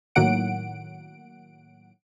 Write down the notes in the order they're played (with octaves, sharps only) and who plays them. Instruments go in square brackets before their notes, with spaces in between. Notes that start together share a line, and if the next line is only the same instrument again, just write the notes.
[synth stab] A2 D#3 F#3 A#3 F#5 D7